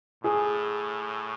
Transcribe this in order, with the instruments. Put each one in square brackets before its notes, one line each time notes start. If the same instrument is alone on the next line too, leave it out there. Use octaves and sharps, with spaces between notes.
[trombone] A2 [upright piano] G#4